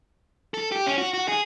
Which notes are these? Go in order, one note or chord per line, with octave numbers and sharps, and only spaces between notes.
A4
G4
C#4
F#4
F#4
G#4